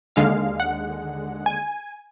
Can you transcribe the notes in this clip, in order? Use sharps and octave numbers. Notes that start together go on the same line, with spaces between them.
D#2 D3 G#3 F5
F#5
G#5